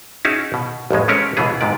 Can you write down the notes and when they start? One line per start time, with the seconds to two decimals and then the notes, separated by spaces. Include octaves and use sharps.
0.25 C#4 D#4 E4 F#4 G#4 C#5
0.54 B2
0.91 A1 F2 A2 G#3
1.08 G#3 C4 C#4 A#4 B4 C#5
1.37 C#2 B2 E3 B3 G#4
1.61 G#2 C3 B3 D5